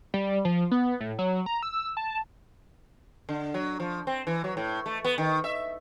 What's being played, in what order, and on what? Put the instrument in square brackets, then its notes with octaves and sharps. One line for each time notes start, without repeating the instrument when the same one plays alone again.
[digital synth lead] G3
F3
B3
A2
F#3
A#5
E6
A5
[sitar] D3
F#3
F3
C4
E3
F#3
A2
A3
B3
D#3
E5